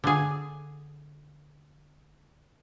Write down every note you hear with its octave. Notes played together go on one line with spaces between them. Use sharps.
D3 G#4